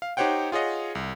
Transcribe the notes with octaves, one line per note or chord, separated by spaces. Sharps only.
F5
D#4 G4 C5 C#5 F#5 G5
F4 G#4 C#5 D#5 F#5
C2